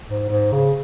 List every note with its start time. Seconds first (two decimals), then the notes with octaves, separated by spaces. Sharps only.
0.09 G#2
0.30 G#2
0.52 C#3